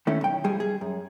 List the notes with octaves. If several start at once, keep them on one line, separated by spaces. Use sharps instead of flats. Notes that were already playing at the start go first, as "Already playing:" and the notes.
D#3 A3 C#4 E4
B1 G5
F2 G3 G#4
G#4
F#2